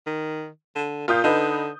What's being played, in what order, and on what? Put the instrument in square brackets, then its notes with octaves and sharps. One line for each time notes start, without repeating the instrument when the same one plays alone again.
[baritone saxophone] D#3
D3
[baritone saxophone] A#2 [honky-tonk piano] F4 D#6 G6
[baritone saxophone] D3 [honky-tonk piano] D#4 B4